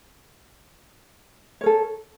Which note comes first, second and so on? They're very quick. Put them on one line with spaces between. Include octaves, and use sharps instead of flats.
C#5 A#4 A4